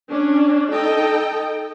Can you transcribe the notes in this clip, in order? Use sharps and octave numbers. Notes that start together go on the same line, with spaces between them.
C#4 D4
D#4 A4 D#5 G5